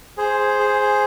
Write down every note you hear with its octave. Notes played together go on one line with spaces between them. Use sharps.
G#4 C5
G#4